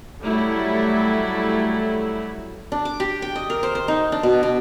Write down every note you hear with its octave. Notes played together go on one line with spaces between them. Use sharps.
F#3 G3 A3 E4
D4
D6
G4
G5
D#5
A#4
C5
C5
D#4
D4
B2
B2